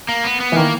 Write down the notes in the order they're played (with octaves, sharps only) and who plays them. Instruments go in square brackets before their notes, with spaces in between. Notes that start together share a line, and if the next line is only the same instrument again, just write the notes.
[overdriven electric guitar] A#3
B3
B3
[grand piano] E3
[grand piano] D#3 [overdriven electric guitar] A#3